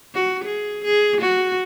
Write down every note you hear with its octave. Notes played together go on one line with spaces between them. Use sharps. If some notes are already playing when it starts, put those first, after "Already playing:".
F#4
G#4
G#4
F#4